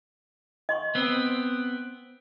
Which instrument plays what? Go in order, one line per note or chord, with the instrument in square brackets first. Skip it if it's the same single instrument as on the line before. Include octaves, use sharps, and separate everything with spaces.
[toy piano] D#5 C6 C#6
[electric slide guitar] B3 C4